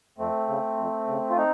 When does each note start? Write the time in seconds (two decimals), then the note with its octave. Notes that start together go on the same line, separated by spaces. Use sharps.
0.18 F2 A3 C4
0.48 C#3
0.77 F2
1.08 C#3
1.30 F4
1.37 C4 D#4